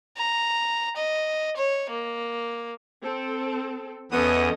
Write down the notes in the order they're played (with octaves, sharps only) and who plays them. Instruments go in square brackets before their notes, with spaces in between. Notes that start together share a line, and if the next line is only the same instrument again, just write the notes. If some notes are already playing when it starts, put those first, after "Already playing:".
[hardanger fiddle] A#5
D#5
C#5
A#3
[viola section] C4 A4
[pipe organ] E2 D#6 [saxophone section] B3 [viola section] C#4 A4 D#5